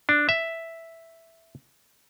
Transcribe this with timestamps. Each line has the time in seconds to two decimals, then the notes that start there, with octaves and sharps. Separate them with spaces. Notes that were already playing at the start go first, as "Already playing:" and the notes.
0.09 D4
0.29 E5